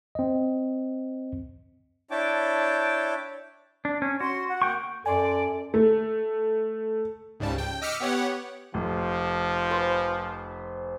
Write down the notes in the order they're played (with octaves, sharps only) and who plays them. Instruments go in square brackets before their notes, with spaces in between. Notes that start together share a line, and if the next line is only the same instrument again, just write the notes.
[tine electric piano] C4 D#5
[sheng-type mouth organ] D4 E4 C#5 G5 A5 D6
[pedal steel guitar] D4
C#4
[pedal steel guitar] F#4 [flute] C6
[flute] F#5
[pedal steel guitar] A#3 G5 C#6
[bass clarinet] F#2 [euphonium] A4 [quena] D5 [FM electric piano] G#5 C6
[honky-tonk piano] A3
[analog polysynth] C#2 G#2 C#3 G3 A5
G5
D#5 D6 E6 F6 B6 C#7
B3 G4 C#5 F#5
[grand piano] F1 [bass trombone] F3
[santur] B4 C5 G#5